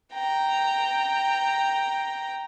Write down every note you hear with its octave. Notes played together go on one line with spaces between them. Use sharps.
G5 A#5